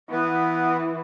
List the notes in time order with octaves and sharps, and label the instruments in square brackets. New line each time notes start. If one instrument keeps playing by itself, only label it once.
[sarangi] E3 [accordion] B3